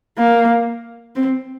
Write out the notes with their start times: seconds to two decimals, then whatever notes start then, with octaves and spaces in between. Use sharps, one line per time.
0.19 A#3
1.16 C4